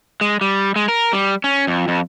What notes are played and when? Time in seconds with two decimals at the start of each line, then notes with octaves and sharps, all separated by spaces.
0.21 G#3
0.41 G3
0.76 G#3
0.88 A#4
1.13 G3
1.44 C#4
1.67 F2
1.88 F2